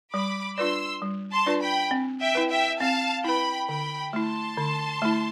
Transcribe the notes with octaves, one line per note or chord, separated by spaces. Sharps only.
G3 B5 D6
D4 F4 B4 D5 C6 E6
G3
A5 C6
D4 F4 B4 D5
G5 B5
C4
E5 G5
E4 B4
E5 G5
C4 F5 A5
E4 B4 G5 B5
D3 G5 B5
A3 E4 A5 C6
D3
A3 E4